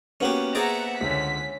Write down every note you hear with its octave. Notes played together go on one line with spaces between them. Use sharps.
A#3 B3 C#4 F#4 G4
G#4 C5 D5 E5 F#5 A#5
C#2 D3 C#4 B6